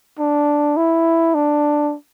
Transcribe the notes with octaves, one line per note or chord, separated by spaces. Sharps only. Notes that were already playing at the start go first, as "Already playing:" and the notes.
D4
E4
D4